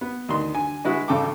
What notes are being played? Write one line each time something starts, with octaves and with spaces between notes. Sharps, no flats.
B3
D2 D#3 C6
D3 G#5
D3 G#3 E4 F#4 B4
G#1 C#3 A4 G5 D6